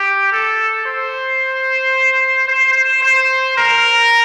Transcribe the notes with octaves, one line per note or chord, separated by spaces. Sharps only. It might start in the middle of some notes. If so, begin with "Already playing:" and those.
Already playing: G4
A4
C5
C5
C5
A#4